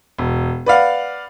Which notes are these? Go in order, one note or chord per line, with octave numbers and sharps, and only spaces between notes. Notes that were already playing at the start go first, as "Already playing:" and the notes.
E1
B4 D5 F5 F#5